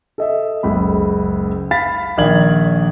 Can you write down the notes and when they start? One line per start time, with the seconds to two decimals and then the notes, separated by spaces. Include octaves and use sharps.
0.18 A4 D#5 E5
0.63 F#1 C#2 B5
1.71 F5 B5 A6 B6
2.17 A#1 D#3 D5 F5 G#6 F#7